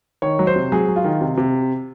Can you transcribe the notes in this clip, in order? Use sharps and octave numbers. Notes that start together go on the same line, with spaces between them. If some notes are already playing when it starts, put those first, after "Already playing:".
D#3 C#5
F#3
C5
C3
F#3 G#4
F#3
F4
D#3
C3
C3